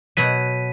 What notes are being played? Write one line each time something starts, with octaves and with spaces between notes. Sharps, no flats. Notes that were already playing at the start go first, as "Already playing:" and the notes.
B2 F#3 B6 D#7